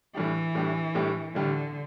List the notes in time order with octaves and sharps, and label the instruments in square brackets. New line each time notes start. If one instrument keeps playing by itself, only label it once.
[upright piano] A2 G3 D4 G4 [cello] E3
[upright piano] A2 G3 D4 G4
A2 G3 D4 G4
[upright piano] A2 G3 D4 G4 [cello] D3